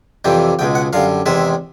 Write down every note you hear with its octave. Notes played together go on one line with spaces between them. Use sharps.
F2 C3 E3 G3 G5
C#2 B2 G#3 G5
F#5
F#2 D3 G3 F5
E2 C3 D#3 G#3 E5